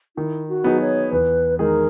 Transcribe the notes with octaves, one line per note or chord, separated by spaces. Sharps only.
D#3 E4
F#4
F#3 B3 D#4 G#4
C#5
E2 B4
D#3 G#3 D#4 G#4 A#4